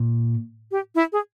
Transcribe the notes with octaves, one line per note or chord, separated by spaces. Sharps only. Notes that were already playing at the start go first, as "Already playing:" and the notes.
Already playing: A#2
G4
E4
G#4